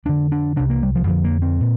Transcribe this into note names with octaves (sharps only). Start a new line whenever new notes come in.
F2 D3 D4
D4
C2 C3 D4
A#3
G3
F3
F2 D3 F3
A#3
C4
A#2